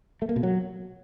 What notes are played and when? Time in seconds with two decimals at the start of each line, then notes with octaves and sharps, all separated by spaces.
0.22 A3
0.29 A#3
0.36 B2
0.43 F#3